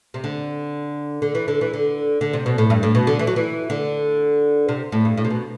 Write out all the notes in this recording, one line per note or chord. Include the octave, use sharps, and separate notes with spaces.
C3
D3
D3
E3
D3
E3
D3
D3
C3
B2
A2
G2
A2
B2
D3
E3
F#3
E3
D3
C3
A2
G2
A2
C3
B2